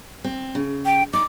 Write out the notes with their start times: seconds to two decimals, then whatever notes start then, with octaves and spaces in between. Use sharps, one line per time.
0.24 C4
0.55 C#3
0.85 G5
1.13 D#4 D6